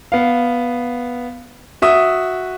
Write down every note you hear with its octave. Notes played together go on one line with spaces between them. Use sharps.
B3 F5
F#4 E5 D#6